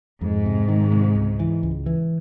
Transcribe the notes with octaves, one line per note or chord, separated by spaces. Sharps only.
F2 G#2
C3
D#3
C3
C#2
E3
C#2
E3